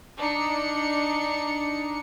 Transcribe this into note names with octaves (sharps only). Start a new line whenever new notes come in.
D4 D#4 C#7